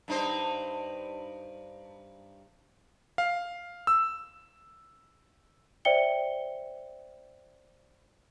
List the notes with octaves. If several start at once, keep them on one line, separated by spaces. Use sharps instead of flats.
G2 D#4 C5
F5
E6
C5 D5 E5 G5 C#7 G7